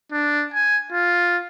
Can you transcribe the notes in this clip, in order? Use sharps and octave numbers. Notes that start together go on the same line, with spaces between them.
D4
G#5
F4